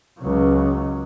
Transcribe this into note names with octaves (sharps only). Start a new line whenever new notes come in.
C#2 F#3